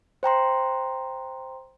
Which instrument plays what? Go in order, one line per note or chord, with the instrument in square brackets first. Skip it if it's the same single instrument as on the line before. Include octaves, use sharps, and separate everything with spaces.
[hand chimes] C5 G5 A#5 C6